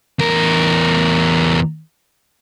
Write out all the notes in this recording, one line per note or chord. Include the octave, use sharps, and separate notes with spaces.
E2 A#4